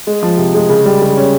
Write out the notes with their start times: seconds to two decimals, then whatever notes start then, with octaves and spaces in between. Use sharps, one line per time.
0.07 G#3
0.22 F3
0.38 C3
0.54 G#3
0.69 C#3
0.86 G3
1.02 C#3
1.17 C#4